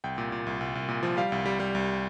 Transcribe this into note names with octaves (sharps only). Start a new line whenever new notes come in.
C2 G5
A#2
A#2
C2
C2
C2
A#2
F3
G3 F5
C2
G3
G3
C2